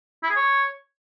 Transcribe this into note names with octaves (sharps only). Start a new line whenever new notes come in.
E4
G#4
C#5